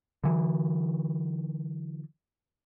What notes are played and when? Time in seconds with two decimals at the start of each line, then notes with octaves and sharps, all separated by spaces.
0.24 D3 E3 F#3